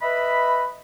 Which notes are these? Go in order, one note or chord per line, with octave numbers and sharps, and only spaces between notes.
B4 D#5 E5 B5